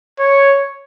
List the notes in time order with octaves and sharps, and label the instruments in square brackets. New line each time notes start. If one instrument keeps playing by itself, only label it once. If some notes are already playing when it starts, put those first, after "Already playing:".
[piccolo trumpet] C#5